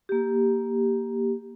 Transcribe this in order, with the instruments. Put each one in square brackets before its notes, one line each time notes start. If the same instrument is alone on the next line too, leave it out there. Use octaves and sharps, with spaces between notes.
[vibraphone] A#3 G4